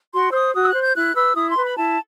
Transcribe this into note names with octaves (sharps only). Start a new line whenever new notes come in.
F#4 C6
E6
C5 D#6
F#4 D#6
E6
F#6
C5
G6
E4 F#6
B4 E6
E4 D#6
C6
B4
B5
E4 A5